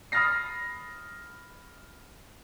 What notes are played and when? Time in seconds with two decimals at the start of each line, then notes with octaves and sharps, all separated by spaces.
0.12 B5 D#6 F6 A6 A#6 C7